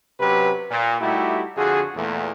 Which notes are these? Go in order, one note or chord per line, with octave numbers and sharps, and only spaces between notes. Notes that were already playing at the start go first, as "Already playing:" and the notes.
C3 F#3 C#4 G4 B4
A#2
G3 A3 D#4 E4 F#4 G4
F2 D3 F4 F#4 G#4
E2 A#2 A3